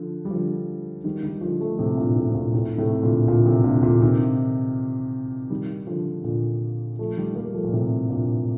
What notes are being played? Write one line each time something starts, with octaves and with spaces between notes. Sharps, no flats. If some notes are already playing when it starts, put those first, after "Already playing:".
Already playing: D3 F3
G3
D3 F3
D#3 G3
D#3 G3
D3 F3
F3 A3
A2 C3
G2 A#2
A2
C3
G2 A#2
A2
A2 C3
A#2 D3
A#2 D3
A2 C3
A#2 D3
A#2 D3
C3 D#3
D#3 G3
D3 F3
A#2 D3
F3 A3
D#3 G3
G3 A#3
F3 A3
A#2
A2 C3
G2 A#2